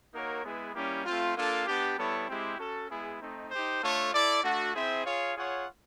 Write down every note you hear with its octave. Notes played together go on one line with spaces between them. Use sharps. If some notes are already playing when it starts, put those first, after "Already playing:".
A#3 D#4 F#4 A#4 C#5
G#3 B3 E4 G#4 B4
G3 A#3 C#4 E4 G4
A3 C4 F4
A#3 D4 F4 A4
B3 D4 G4
G3 B3 E4 A4 C#5
G#3 C4 E4 G4
C#4 F#4 A4
G#3 B3 E4 G#4
A3 C4 D#4
D#4 G4 C5
A3 D4 F4 A4 C#5
E4 A4 D5
A3 D4 F#4
C4 E4 G#4 C5 E5
F4 G#4 C#5 F5
F4 G#4 C#5 F#5